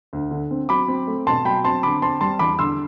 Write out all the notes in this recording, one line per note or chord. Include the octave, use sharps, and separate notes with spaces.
D2
D3
C4
F#3 B5 D6
C4
A3
B2 A5 C6
F#3 G5 B5
C4 A5 C6
D3 B5 D6
C4 A5 C6
G3 A5 C6
E2 B5 D6
D3 C6 E6